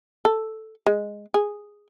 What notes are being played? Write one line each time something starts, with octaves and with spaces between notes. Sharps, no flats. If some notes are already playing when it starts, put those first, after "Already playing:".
A4
G#3
G#4